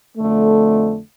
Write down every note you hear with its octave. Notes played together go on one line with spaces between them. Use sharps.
F2 D3 A3